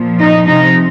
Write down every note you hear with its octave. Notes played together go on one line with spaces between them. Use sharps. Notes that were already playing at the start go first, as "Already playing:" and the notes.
Already playing: A#2 F3
D#4
C3 F3 D#4